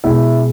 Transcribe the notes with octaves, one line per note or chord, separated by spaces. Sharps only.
B2 G#3 E4 E5